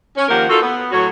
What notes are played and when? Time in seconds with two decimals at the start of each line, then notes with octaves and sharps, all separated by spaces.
0.16 C#4
0.29 D#3 F3 A#3 G4 A#4 F#5
0.49 D#4 F4 F#4 A4
0.62 B3
0.92 A2 F#3 F#4 C#5